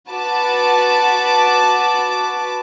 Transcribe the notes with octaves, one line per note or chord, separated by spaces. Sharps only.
F#4 B4 A5 D6